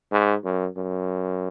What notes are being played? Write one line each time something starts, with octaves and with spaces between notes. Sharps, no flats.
G#2
F#2
F#2